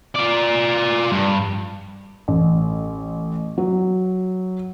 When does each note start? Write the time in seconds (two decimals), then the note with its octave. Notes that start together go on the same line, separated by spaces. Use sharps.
0.15 F4 D5
1.12 G2
2.28 A1
3.58 F#3